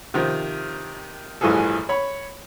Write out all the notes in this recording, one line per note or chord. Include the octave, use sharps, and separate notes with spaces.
C3 D#3 F3
A1 G2 E3 F3 G#4 A4
C#5 B5